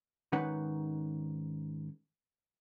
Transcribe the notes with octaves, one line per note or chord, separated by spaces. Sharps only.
G#2 D#3 C#4 D#4 B4 F#5